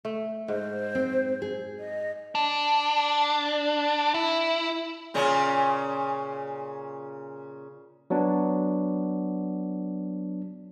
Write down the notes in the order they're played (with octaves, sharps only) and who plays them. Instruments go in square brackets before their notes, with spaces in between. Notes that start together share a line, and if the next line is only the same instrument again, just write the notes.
[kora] A3
[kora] G#2 [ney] C5
[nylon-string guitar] C4
G#4
[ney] D#5
[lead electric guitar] D4
E4
[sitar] A#2 C#3 C#4
[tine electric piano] F#3 B3 D4